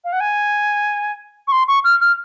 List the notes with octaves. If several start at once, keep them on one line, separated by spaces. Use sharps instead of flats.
F5
F#5
G#5
C#6
C6
C#6
F6
F6